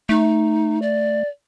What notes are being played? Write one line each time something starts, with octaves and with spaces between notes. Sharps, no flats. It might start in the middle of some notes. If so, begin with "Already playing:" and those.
A3 D#4
D5